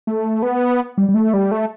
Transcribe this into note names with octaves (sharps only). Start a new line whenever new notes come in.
A3
B3
G3
G3
A3
G3
A3